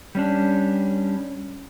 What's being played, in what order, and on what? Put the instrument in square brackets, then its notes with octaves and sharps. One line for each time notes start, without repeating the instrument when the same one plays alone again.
[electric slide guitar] G3 C#4 D4